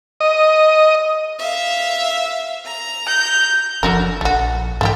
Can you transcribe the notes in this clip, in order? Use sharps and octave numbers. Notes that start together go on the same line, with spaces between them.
D#5
E5 F5
A#5
G6
F#1 D3 F3 D4 F#4 A#4
A#1 A3 F#4
G#2 E3 A3 F4 G4